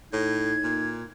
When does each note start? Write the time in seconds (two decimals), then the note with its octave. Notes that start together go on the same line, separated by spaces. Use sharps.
0.13 A2 D#4 G#6
0.64 A#2